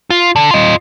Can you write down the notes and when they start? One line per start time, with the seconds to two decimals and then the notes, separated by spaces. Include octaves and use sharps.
0.10 F4
0.36 D3
0.51 F4 D#5